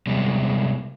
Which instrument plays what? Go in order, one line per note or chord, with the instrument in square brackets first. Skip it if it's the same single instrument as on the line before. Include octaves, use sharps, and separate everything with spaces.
[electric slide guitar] C3 G3 G#3 B3